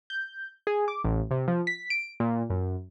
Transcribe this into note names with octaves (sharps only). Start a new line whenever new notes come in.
G6
G#4
D6
A1
C3
F3
B6
D7
A#2
F#2